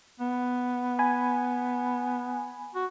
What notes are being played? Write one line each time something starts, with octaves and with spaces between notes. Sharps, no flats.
B3
G#5 B5
F#4